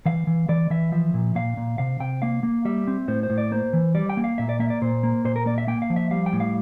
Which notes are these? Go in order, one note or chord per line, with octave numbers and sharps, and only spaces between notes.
E3 F5
E3
E3 D5
E3 E5
F3 E5
A#2
A#2 F5
A#2
C3 F5
C3 G5
A#3 F5
A#3
G3 E5
C4
A2 C5
C5
A2
D5
A#3 C5
E3
G3 D5
G5
A#3
F5
A#2 E5
D5
A#3 E5
D5
A#2 C5
A#3
A#2 C5
A#4
A#3 D5
E5
A#3 G5
F5
F3
E5
G3 F5
G5
A2
F5